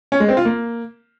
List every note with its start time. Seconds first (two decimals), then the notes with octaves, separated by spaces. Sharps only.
0.12 C#4
0.20 G#3
0.29 C4
0.37 F4
0.45 A#3